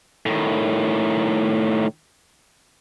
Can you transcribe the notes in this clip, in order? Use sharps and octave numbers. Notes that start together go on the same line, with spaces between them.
A2 D#3